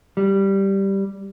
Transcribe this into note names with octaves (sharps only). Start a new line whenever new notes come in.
G3